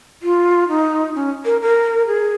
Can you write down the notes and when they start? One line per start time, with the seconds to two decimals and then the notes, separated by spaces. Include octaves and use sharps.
0.22 F4
0.68 D#4
1.15 C#4
1.45 A#4
1.61 A#4
2.07 G#4